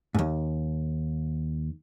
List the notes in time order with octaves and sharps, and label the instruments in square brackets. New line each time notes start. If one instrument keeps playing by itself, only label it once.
[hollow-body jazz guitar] D#2 G#2